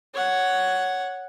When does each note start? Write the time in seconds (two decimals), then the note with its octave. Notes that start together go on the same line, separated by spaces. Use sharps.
0.14 C#5 F#5